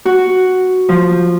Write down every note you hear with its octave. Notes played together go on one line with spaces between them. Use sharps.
F#4
F3